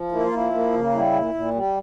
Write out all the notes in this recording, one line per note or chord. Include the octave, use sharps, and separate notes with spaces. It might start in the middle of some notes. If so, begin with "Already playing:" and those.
Already playing: F3
A#3 E4
F4
F3 E4
A#3
C#3
G3 E4
A#2
A#2
G3